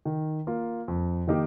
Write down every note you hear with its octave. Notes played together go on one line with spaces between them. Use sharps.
D#3
A#3 F4
F2
D#3 A#3 D#4 G4